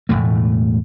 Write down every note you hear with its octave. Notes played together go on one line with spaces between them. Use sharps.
E1 D#2 A2 A3